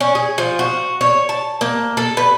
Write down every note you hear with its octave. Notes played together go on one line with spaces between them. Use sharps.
C#4
G#4
F3
F#4
C#5
A5
A#3
A4
B4